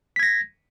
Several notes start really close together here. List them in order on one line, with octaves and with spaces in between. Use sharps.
B6 G#6 A#6